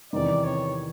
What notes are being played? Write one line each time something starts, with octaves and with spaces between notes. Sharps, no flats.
E2 C3 D#3 D5
C#5